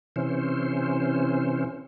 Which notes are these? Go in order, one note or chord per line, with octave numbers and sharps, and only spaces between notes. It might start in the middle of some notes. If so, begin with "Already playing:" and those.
C3 E3 C#4 C5